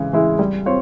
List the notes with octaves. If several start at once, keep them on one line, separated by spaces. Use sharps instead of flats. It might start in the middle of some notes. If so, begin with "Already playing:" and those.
Already playing: C#3 E3 G#3
E3 G#3 E4
G3
C4 F4 C#5